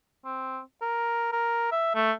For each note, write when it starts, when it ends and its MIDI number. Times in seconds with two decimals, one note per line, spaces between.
0.25 0.59 60
0.81 1.30 70
1.32 1.68 70
1.72 1.94 76
1.95 2.12 57